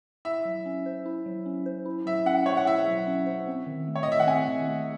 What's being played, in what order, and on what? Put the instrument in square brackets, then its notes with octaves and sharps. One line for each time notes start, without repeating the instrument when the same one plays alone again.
[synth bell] E4 [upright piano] E5
[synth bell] F#3
C#4
C5
E4
F#3
C#4
C5
E4
[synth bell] F#3 [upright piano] E5
[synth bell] C#4 [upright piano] F#5
[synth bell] C5 [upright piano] C#5
[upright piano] F#5
[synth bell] E4 [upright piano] E5
[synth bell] F#3
C#4
C5
C4
D#3
A3
[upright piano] C#5
D#5
[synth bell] D#3 [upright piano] E5
[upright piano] F#5
[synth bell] C4 [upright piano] G#5
[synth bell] D#3
A3